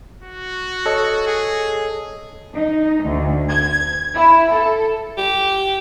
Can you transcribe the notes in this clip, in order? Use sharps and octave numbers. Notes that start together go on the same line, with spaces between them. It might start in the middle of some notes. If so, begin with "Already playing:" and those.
F#4
A4 C#5 D#5
G#4
D#4
D2
G#6
E4
A4
G4